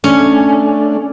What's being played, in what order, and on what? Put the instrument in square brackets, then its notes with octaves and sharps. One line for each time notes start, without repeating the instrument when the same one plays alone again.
[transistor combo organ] A3 D4 [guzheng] C#4